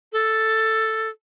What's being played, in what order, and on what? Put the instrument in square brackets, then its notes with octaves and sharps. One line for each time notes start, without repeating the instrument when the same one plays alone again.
[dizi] A4